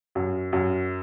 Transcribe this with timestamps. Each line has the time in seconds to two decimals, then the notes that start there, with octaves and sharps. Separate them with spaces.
0.15 F#2
0.53 F#2